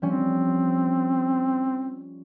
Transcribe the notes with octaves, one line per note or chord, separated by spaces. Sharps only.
F3 G3 C4 C#4